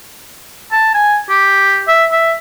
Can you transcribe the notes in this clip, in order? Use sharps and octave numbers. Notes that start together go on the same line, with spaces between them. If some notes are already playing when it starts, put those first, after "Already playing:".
A5
G#5
G4
E5
E5